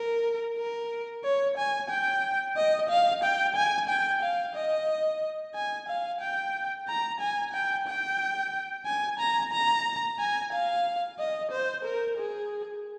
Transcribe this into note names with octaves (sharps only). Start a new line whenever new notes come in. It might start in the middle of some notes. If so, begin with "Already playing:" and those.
Already playing: A#4
A#4
C#5
G#5
G5
D#5
F5
G5
G#5
G5
F5
D#5
G#5
F5
G5
A#5
G#5
G5
G5
G#5
A#5
A#5
G#5
F5
D#5
C5
A#4
G#4